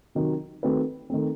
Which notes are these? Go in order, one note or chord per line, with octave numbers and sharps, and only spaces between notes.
C3 D#3 F#3
D#3 A3 C4 F#4 B4
D#3 A3 C4